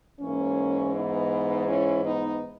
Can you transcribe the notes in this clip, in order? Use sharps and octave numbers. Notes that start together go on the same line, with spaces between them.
G#2 E3 A#3 C#4
B3 D#4
C#4 E4
B3 D#4